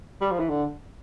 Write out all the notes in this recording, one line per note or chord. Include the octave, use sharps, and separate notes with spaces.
G3
F3
E3
D3